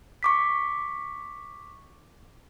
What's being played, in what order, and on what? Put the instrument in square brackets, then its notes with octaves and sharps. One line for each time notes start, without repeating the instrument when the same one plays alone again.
[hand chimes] C#6 D6 B6